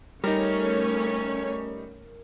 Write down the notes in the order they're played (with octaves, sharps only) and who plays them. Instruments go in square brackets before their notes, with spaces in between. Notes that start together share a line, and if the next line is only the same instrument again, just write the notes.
[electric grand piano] G3 D#4 [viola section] A3 C#4 C#5 [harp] A#4